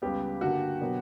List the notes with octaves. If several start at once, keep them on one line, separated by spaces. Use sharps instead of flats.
C#2 C#3 G3 B3 G4
G2 D3 A#3 F#4
B2 F#3 B3 D4 A#4